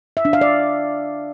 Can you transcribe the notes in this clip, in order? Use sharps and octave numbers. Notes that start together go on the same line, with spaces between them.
E5
D4
F5
D5